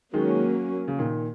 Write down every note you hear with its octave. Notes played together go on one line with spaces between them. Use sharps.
D#3 F#3 G#3 A#3 C#4
C#3
A#2 D#3